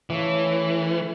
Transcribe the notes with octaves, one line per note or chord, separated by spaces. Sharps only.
C#3 E3 A3